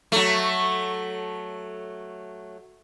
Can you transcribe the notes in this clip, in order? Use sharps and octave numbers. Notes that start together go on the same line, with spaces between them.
F#3 A3